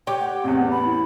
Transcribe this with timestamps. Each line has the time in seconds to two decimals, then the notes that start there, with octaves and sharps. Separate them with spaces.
0.07 G4 C#5 G5 D6
0.20 F#5
0.44 A1 E2 C4 F#5
0.57 B3
0.71 B5
0.85 E4